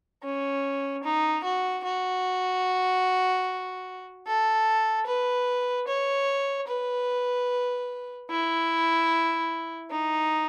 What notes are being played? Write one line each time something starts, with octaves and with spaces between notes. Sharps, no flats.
C#4
D#4
F#4
F#4
A4
B4
C#5
B4
E4
D#4